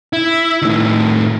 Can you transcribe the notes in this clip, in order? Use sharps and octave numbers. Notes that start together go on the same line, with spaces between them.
E4
A2 D#3